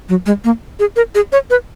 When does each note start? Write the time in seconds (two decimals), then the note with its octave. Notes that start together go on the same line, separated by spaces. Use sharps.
0.09 F#3
0.26 G#3
0.44 A#3
0.80 G#4
0.96 A#4
1.15 G#4
1.32 C#5
1.50 B4